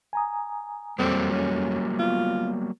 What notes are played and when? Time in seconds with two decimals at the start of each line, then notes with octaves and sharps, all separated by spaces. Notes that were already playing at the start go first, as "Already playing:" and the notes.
0.13 G#5 A#5 D#6
0.99 F2 F#3 G3 A#3 C4 A4
1.31 C#4
1.99 B3 F4